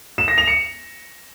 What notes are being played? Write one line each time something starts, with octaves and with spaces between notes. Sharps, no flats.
E7
A#6
F7
C#7